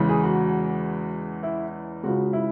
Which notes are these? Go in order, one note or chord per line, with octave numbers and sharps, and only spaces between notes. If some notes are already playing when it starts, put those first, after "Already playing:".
Already playing: E2 C#3 E3 G#3
G#4
F#4
E4
C#2 C#3 G#3 F#4
E4